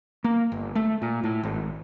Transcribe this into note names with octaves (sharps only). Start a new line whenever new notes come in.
A#3
G1
A3
A#2
A2
G#1